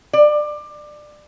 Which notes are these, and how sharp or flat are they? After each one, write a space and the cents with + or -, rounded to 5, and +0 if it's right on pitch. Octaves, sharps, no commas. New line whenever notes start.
D5 +20